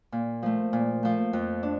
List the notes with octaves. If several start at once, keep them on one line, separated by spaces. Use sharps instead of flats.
A#2
F3 A3
A#2
F3 A3
F2
D4